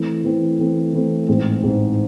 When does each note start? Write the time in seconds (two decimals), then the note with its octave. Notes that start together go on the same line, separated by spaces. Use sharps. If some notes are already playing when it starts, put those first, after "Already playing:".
Already playing: E3 A3 C4 E4
0.24 E3 A3 C4 E4
0.59 E3 A3 C4 E4
0.93 E3 A3 C4 E4
1.29 A1 G#2 G#3 C4
1.62 A1 G#2 G#3 C4